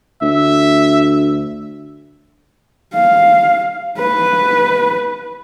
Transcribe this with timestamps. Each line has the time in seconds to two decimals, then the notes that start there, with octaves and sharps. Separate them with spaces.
0.22 D2 E5
2.94 F5
3.98 B4